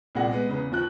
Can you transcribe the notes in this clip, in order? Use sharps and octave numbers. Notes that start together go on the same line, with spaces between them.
C2 A#2 G3 G#4 F#5 A#6
G#3 B3
E2 C#3 B3
D#2 F3 F#6 F#7